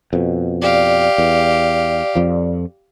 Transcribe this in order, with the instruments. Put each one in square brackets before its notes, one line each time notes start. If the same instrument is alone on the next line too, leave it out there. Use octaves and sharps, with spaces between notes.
[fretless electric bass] F2 B2
[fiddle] G4 F5 [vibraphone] D5
[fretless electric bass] E2
F2 F3